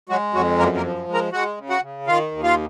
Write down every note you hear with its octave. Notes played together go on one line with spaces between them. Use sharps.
F#3 G#3 F#4
F2 F#3 F#4
F#2 A#3 A#4
A#3 A#4
F3
G#3
A#4 A#5
G#3 F#4 F#5
C#3
F#4 F#5
C#3
D#3 F4 F5
D#2
F4 F5